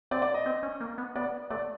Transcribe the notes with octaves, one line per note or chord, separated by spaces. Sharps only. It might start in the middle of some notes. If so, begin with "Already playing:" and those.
C4 D5
D5
D#5
C4
C#4
A#3
B3
B3 D5
A3 D5